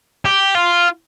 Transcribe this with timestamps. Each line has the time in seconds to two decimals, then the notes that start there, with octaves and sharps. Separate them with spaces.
0.25 G4
0.55 F4